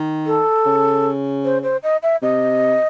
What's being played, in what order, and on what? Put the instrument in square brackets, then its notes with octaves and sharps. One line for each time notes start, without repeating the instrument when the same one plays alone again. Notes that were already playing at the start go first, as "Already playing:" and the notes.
Already playing: [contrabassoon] D#3
[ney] A4
[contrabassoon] C#3
[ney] C5
C5
D#5
E5
[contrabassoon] C3 [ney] D#5